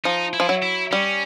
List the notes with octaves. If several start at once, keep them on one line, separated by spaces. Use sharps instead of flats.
F3 D#4
E4
F3
F#3
E4
G3 C#4